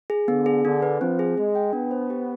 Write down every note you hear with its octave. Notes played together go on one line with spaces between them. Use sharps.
G#4
D3 B3
G#4
D3 D4
B4
F3 C4
G#4
G#3 G#4
G5
B3 D4
C5
G4